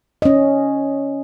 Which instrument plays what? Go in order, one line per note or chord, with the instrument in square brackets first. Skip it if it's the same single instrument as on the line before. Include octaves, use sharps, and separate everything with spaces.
[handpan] C#4 D#5